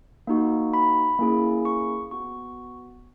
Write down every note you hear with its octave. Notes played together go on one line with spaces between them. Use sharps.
A#3 D#4 F#4
B5
A#3 C#4 E4 G#4
C#6
B3 F#4 C#6